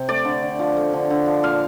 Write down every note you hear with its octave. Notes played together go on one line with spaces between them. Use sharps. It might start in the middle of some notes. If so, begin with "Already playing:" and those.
Already playing: C3 G5
A3 D5
D3
D3
F3
A3
D3
D3
F3
A#2 F5